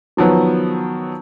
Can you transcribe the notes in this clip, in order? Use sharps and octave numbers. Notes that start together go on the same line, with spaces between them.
D#3 F3 F#3 B3